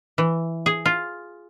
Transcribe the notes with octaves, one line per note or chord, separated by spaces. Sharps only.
E3
G#4
F4